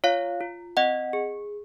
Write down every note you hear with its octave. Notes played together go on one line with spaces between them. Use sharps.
F4 C#5 F5
F4
C4 D#5 F#5
G#4